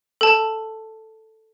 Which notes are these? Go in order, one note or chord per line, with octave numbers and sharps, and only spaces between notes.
A4 A5